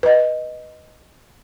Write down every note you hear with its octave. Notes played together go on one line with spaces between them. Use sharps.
B4 D#5